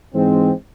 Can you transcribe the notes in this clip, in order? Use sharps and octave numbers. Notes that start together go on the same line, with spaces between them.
G#2 E3 G#3 C4